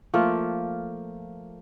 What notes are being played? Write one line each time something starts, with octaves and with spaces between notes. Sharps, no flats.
F3 A3 A#3 F4